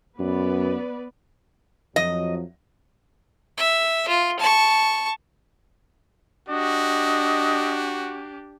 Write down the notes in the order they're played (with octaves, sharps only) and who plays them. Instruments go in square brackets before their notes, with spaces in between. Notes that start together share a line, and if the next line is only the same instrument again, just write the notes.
[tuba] F#2 [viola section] B3 B4 D5
[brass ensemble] F2 F3 F#3 [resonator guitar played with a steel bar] D#5
[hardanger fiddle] E5
F4
A5 C#6
[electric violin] D4 G4 [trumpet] F#4 [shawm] D#5